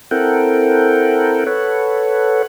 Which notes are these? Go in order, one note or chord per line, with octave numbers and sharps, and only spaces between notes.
C4 E4 A4 A#4 F#5 G5
A4 B4 C#5 F#5